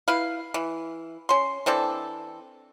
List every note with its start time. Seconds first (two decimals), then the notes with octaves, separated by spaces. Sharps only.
0.08 E4 B4 F5
0.54 E3
1.29 C#4 C6
1.66 E3 C4 D4 A4